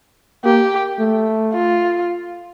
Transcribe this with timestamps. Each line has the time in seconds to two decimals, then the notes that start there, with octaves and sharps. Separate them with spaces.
0.44 A#3 G4
0.99 A3
1.53 F4